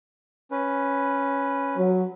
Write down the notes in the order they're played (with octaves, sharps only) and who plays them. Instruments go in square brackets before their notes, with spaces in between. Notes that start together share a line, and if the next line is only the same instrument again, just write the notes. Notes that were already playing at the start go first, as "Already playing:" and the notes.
[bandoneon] C#4 B4
[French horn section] F#3